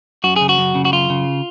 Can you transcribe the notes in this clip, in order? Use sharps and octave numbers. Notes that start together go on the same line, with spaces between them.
F#2 F#4
C#3 G#4
F#4
F#2
C#3
F#4
F#2 F4
C#3